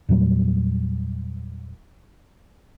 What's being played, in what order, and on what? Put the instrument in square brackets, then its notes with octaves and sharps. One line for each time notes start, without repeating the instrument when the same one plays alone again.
[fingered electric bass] E2 A#2 F#3 G3